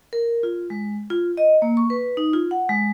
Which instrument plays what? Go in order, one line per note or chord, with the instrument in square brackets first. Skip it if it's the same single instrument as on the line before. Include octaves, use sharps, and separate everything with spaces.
[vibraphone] A#4
F4
G#3
F4
D#5
A#3
C#6
B4
D#4
F4
F#5
G#3